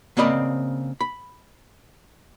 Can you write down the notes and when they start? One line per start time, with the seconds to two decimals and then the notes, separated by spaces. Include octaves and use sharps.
0.17 C#3 A#3 C4 D5 D#5 B5
1.01 B5